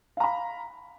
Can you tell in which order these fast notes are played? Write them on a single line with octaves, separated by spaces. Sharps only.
F5 A#5 B5